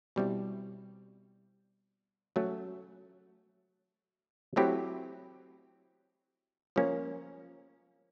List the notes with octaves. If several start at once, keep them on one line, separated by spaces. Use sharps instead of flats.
B2 G3 C4 E4
F#3 A3 C#4
F#3 A3 C4 E4 G4
F3 A#3 C#4